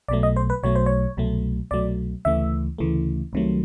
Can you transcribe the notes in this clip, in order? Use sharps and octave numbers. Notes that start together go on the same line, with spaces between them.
B1 B2 F#3 A3 D5
D#5
C5
B4
B1 B2 F#3 A3 C#5
C5
C#5
C2 B2 F#3 A3
C2 B2 F#3 A3 D5
D2 C#3 E3 A3 E5
D2 C#3 E3 A3
C2 C3 D#3 F#3 A3